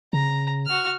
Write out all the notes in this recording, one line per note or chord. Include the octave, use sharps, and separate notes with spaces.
C#3 A#5
F#4 F6